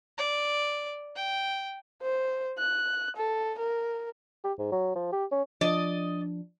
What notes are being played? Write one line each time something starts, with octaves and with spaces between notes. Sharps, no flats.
D5
G5
C5
F#6
A4
A#4
G4
G#2
F#3
F3
G4
C#4
F3 D4 D5 D#5